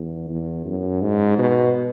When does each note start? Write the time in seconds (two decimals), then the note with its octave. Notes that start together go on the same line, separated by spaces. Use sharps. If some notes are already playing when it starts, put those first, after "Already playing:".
Already playing: E2
0.29 E2
0.66 F#2
1.02 G#2
1.38 B2